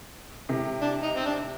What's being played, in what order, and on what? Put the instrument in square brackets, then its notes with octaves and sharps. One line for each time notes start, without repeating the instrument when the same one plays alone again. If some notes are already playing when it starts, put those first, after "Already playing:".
[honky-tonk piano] C3
[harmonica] D4
D#4
C4
D4